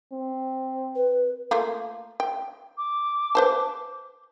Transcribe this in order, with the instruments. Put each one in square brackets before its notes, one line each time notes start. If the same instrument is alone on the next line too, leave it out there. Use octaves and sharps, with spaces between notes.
[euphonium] C4
[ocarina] B4
[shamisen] A3 A#3 F4
G5
[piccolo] D6
[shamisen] B4 C5 A5